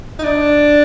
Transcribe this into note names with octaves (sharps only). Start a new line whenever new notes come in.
D#4
D4